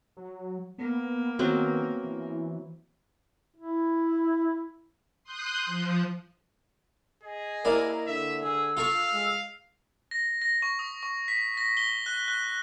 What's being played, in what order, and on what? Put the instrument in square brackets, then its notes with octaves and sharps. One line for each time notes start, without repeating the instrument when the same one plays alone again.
[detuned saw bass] F#3
[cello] A#3 [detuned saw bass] B3
[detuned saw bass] D#3 [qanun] F#3 B3 C4
[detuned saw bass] E3
[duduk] E4
[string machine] C6 D#6 F#6 G6
F3
[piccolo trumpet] G#4 [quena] D#5
[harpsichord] A#3 E4 D5 [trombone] A#4
[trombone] D3 [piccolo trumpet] E5
[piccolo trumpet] G#4 [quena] E6
[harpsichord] F4 A4 C#6 [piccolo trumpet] F5
[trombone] G#3
[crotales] A#6
A#6
C#6
D#6
C#6
B6
A#6
G7
F#6
F#6